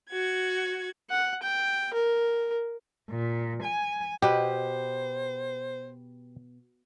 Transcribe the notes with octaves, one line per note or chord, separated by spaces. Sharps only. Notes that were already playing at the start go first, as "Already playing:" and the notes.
F#4 G#6
F#5
G5
A#4
A#2
G#5
B2 G4 B4 C5